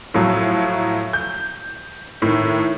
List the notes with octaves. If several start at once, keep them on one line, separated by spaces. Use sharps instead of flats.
A2 F3 F#3
G6
A2 D#3